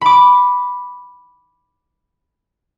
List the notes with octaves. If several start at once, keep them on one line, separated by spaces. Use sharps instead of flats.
B5 D6